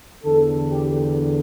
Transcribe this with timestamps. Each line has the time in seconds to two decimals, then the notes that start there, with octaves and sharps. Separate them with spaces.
0.24 E2 D3 A4
0.70 G4